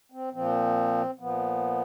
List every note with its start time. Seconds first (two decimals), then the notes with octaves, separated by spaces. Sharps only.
0.12 C4
0.33 A#2 F3 C4
1.19 A#2 F3 B3